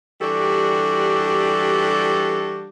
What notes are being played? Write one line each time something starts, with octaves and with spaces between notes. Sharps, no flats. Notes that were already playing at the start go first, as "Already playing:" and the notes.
E3 G3 D4 F#4 G4 A4